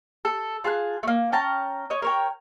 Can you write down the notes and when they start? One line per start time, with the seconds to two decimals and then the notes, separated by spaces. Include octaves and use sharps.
0.25 A4
0.64 F4 G#4 A5 F#6
1.03 A3 A#3
1.32 C#4 G5 A5 A#5
1.90 C#5 D#5
2.02 A#4 C#5 G5